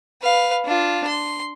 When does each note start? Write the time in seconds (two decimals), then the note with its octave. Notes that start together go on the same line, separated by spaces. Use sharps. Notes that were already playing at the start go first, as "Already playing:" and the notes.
0.22 B4 F5
0.65 D4 F4
1.07 C6